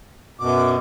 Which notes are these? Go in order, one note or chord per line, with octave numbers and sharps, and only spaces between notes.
F#2 B2 D6